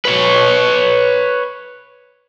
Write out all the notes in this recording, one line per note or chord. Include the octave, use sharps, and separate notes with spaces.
B4 C#5